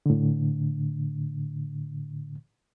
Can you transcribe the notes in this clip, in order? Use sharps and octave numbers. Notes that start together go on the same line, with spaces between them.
A2 D3